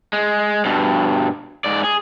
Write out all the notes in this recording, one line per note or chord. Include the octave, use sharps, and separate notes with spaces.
G#3
G2 B2
G#2 D5
G#4